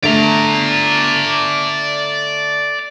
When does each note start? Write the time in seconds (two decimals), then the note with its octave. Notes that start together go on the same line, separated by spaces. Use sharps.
0.03 D3 A3 D5 A#5